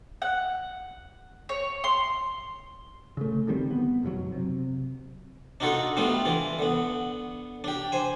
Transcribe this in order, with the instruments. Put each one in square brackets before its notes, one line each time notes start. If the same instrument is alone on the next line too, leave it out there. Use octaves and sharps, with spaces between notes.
[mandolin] F#5
C#5
C6
[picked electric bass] C#3 A3
D3 D#3 G3 C4
B3
F#1 B1 A#2 F#3
C3
[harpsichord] D4 D#4 F4 F#4 A4
G3 A3 B3 D4 F4
E3 F4
D3 B3
D4 G4
C5 G#5